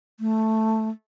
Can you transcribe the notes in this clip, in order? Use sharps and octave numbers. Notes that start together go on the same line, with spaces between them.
A3